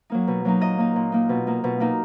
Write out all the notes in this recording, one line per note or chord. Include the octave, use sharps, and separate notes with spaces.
F#3 A#3 D#4
B2
F#3 A#3 D#4
A#2 D#5
A#3 D#4
A#2
A#3 D#4
B2
A#3 D#4
B2
A#3 D#4